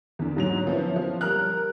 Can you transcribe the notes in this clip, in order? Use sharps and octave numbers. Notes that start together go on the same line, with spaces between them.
E2 D3
G#2 F#3 F7
F3 B3 C#4 E4
F3
G3 A#4 F6 F#6